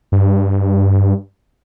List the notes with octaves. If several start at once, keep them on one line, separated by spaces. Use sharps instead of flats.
G2